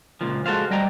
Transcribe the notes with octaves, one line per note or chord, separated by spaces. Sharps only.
C#2 A#2 F3
G#3 F#4 A4 C5 F5
G3 D#5 G5 A#5